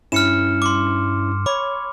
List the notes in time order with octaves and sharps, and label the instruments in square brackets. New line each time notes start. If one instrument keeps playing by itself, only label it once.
[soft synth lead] G2 [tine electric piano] C#4 E4 [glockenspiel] F6 C#7 E7
[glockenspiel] C6 D6
[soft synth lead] C#5 [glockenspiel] B5 D6